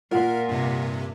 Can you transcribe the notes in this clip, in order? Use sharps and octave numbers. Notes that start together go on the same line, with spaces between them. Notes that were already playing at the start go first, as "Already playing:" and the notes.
A#2 F4 A#4 F#5
G2 C3